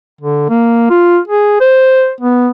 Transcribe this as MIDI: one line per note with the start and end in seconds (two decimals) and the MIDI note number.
0.21 0.49 50
0.49 0.85 58
0.90 1.19 65
1.28 1.60 68
1.61 2.11 72
2.21 2.49 59